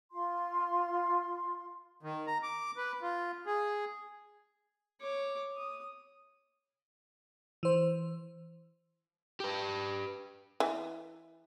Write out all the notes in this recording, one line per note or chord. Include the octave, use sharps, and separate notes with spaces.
F4 C6
D#3
A#5
D6
B4
F4
G#4
C#5 D6
D#6
E3 C5
G4 B4
E3